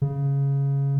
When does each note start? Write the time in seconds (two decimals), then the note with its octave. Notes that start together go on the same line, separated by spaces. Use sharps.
0.02 C#3